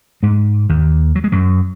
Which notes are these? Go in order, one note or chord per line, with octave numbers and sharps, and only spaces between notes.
G#2 G#3
D#2 D#3
F#3
G#3
F#2 F#3